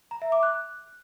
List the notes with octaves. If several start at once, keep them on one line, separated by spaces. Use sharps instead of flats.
A#5
E5
D6
F#6